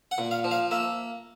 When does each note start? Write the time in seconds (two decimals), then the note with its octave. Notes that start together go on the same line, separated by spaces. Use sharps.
0.11 F#5
0.18 A#2
0.31 F5
0.44 F3
0.51 F5
0.71 A#3 E5